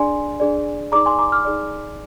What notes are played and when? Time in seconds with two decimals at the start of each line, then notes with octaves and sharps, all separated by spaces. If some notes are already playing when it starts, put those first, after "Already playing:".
Already playing: D4 G#4 D5 G#5 C6
0.40 D4 G#4 D5
0.92 D#4 G#4 D5 A#5 D6
1.06 G#5 C6
1.19 A#5 D6
1.32 D6 F6
1.45 D#4 G#4 D5